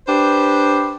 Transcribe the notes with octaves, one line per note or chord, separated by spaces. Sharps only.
D4 G4 B4 C5